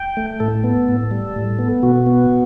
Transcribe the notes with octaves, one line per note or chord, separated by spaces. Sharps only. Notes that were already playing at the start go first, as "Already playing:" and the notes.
Already playing: G5
A3
A2 A4
B3
A2
G3
A2
B3
B2 F#4
B3